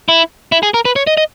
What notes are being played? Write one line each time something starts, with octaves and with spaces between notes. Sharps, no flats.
E4
E4
G#4
A#4
B4
C#5
D#5
D#5